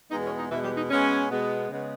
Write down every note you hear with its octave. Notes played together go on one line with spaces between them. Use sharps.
E2 B2 G#3 B3 D#4
C#4
D#4
E2 B2 E3 G#3 B3 E4
G3 G4
D#4
B2 G#3 B3 C#4
B2 G#3 B3
C#3 G#3 B3